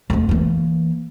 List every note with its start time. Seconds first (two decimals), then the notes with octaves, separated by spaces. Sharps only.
0.10 F2 A3
0.29 E3 A#3